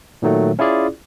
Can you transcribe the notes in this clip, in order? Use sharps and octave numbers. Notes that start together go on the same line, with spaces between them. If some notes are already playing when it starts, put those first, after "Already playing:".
A#2 D#3 F#3 A3
C#4 E4 F4 G#4 D5